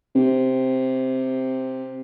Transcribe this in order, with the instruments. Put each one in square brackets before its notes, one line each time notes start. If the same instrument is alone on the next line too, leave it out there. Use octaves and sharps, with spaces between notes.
[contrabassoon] C3